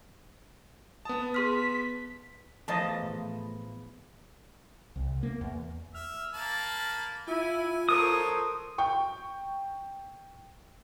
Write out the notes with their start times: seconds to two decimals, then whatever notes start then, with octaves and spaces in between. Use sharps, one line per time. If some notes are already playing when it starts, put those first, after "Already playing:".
1.05 B3 A5 D#6
1.34 G#4 C6 F6 B6
2.68 E2 F3 A3 D#5 A5
3.02 A2 A3 B5
4.96 C2
5.23 A#3
5.41 E2
5.95 E5 F6
6.34 A#3 A5 B5
7.27 E4 F4 G#5
7.89 F#3 A4 A#4 C5 C#5 D#6
8.78 G5 C#6